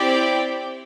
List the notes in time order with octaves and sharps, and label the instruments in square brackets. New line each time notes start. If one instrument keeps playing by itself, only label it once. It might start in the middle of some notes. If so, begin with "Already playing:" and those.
Already playing: [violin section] C4 E4 G4 D5 G5